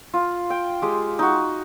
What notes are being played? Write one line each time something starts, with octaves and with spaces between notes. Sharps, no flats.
F4
G5
G#3 G4
D#4 F#4